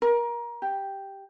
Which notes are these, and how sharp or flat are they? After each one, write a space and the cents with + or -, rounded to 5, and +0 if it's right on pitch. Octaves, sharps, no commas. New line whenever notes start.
A#4 +25
G4 +0